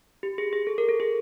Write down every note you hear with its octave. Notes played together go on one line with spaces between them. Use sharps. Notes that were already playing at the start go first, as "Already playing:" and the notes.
G4
G#4
G#4
A4
A#4
A4
G#4